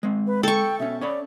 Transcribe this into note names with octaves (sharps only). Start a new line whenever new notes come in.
G#3 C4
B4
A4 G5 C#6
B2 C#4 E5
C#4 C#5 D5 B5